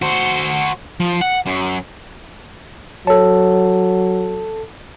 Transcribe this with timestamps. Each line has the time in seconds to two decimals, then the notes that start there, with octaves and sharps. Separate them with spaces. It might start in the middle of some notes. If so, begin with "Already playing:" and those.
0.02 F#4 C5
1.00 F3
1.21 F#5
1.47 F#2
3.07 F#3 A4 C#5 A5